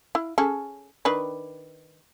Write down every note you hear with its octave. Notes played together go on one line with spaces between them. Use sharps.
E4
C#4 G#4 A4
D#3 D4 B4